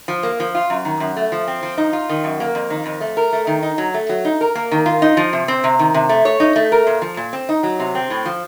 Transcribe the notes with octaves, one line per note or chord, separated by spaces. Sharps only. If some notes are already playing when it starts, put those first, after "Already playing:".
F3
A#3
F3
F4
F#2
D#3
F#2
A3
F3
C4
F3
D#4
F4
D#3
F#2
A#3
F2
D#3
F2
A3
A#4
A3
D#3
D#4
F#3
A3
F#3
D#4
A#4
A#3
D#3
F4
D#4
F3
C3
C4
C3
D#3
C3
A3
C#5
D#4
A3
A#4
A#2
F3
A#2
C4
D#4
F#3
C3
C4
A2
F3